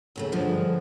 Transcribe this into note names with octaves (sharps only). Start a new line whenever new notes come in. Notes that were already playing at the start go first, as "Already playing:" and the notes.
D#2 C#3 A3
G2 D3 F3 G#3